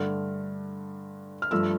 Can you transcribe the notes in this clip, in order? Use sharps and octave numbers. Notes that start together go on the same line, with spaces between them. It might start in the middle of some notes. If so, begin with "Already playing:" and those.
Already playing: G2 D3 A3 F6
F6
G2 F3 A3 E6